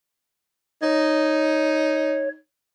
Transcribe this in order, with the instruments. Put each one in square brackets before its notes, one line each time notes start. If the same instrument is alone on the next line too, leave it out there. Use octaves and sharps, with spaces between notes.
[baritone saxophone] D#4 [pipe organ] C#5